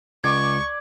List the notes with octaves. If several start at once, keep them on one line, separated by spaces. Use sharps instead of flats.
C#2 D5 C#6 D6 G#6